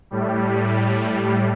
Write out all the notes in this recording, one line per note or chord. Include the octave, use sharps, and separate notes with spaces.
A2 G3